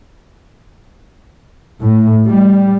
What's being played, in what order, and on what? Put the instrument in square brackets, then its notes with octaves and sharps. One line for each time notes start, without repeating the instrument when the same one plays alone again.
[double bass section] A2
G3